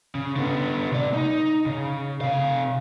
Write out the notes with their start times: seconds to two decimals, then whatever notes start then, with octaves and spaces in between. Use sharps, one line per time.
0.15 C#3
0.36 D3 B3
0.92 C3 D5
1.14 D#4
1.66 C#3
2.21 C3 F5